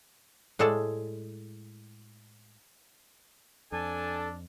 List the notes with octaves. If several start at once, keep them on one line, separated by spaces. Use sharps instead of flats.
A2 G#3 G#4 A4 D5 A5
F2 D4 A4 G#5